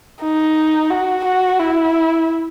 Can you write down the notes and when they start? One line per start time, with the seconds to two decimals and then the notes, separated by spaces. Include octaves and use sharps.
0.22 D#4
0.90 F#4
1.25 F#4
1.59 E4